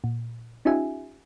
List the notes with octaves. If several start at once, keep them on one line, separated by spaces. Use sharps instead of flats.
A#2
C#4 D#4 F4 G4 E5 G#5